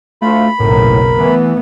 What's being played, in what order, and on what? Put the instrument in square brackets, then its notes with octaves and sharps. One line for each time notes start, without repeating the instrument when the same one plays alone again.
[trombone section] D2 F4 [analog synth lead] A3 [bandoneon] B5
[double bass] F#1 B1 [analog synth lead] A2 [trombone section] A#4
[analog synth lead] E3 [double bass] A3 B3